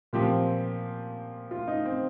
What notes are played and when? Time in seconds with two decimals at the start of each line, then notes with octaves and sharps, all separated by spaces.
0.13 A#2 F3 C4 G4
1.51 F4
1.67 D#4
1.85 C4